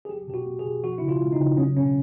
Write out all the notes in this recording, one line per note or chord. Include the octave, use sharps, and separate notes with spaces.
G#4
F#3 G4
B2 G4
F#4
A#3
G#4
B2
F3 F#4
C#3 E4
F4
G#3
D#4
C#3
F#3 C#4
B2 C#4